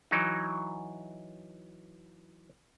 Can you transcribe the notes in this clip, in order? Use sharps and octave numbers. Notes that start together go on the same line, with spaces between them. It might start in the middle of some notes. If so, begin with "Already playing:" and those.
E3 F#3 D#4